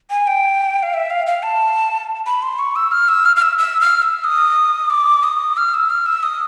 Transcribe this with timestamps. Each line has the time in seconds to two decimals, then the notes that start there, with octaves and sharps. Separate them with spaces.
0.10 G#5
0.27 G5
0.83 F5
0.94 E5
1.10 F5
1.26 F5
1.43 A5
2.26 B5
2.42 C6
2.59 C#6
2.76 E6
2.91 F6
3.08 E6
3.25 F6
3.36 F6
3.42 E6
3.58 E6
3.81 F6
4.02 E6
4.24 D#6
4.90 D6
5.23 D#6
5.57 F6
5.74 E6
5.90 F6
6.06 E6
6.23 D#6